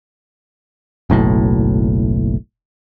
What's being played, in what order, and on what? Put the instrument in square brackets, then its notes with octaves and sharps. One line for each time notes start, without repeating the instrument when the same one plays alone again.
[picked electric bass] F#1 B1 A2